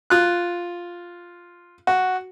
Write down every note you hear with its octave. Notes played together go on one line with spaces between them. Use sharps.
F4 F#6
F#4